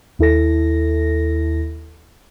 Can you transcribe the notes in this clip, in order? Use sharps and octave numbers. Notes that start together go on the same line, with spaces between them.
D#2 E4 A4 A#6